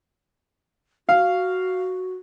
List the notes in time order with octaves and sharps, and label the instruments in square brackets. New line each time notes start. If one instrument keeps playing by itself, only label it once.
[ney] F#4 [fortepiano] F5